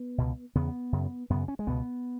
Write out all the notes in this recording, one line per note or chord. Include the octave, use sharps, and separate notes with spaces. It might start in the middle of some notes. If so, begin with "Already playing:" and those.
Already playing: B3
C#2 B2
E2 C#3 B3
F#2 C#3
F#2 C#3 B3
C#4
G#3
C#2 B2 B3